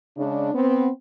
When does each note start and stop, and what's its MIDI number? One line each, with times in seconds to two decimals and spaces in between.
0.18 0.51 49
0.18 0.51 56
0.18 0.51 62
0.54 0.88 59
0.54 0.88 60